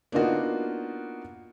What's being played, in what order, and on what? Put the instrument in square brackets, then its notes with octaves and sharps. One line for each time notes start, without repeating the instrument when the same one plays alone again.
[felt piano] A#3 B3 D4 D#4 F4 F#4